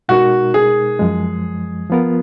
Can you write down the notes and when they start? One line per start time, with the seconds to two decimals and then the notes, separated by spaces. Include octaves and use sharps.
0.09 B2 G#3 D#4 F#4 A#4
0.54 G#4
0.99 F#2 F3 G#3
1.90 F3 B3 F4 A#4